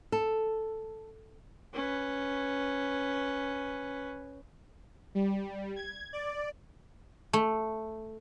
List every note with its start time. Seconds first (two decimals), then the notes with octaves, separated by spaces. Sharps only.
0.12 A4
1.73 C#4 B4
5.15 G3
5.76 G#6
6.13 D5
7.33 A3